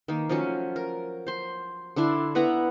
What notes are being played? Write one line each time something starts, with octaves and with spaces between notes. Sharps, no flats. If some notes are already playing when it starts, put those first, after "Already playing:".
D#3 A#3
F3 F#3 A3 C#4
A#4
C5 C6
D3 D4 E4 C6
B3 E4 F#5 A#5